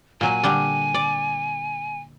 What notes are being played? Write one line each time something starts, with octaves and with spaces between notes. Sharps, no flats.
A#2 F#3 G#5
D3 G3 D4
D5